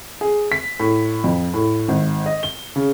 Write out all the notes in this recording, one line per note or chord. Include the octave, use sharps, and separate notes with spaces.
G#4
B6
A2
F2
A2
G#1
D#5
G7
C#3